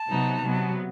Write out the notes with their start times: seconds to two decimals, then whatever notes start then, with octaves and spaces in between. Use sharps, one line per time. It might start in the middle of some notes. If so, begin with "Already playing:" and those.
Already playing: A5
0.09 C3 F#3 B3 D#4
0.44 C3 F#3 B3